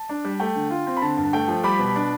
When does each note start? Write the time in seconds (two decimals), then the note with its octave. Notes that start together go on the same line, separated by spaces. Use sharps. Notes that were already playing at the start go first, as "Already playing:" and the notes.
Already playing: A5
0.09 D4
0.25 G3
0.40 A3 G5
0.56 D3
0.70 F4
0.87 C4
0.97 B5
1.02 D3 A5
1.17 G2
1.23 A5
1.33 A3 G5
1.48 F3
1.64 G3 B5 D6
1.79 B2
1.96 D4